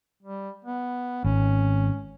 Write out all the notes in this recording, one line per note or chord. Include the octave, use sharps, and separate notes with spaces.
G3
B3
G#1 C#4